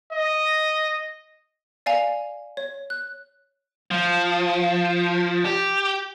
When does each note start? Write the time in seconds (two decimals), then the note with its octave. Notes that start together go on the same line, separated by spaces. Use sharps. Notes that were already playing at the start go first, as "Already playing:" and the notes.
0.13 D#5
1.86 D5 F5 G#5 F7
2.57 C#5
2.90 F#6
3.91 F3
5.45 G4